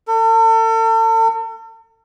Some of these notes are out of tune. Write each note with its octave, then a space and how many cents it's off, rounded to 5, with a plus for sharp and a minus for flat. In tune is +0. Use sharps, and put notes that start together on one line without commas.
A4 +40